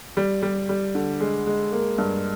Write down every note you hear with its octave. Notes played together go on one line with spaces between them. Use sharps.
G3
G3
G3
D3
G#3
G#3
A#3
G2